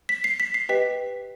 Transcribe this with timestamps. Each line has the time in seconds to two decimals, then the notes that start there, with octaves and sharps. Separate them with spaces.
0.09 B6
0.24 C7
0.40 B6
0.54 C7
0.69 G4 B4 D#5 G5 B6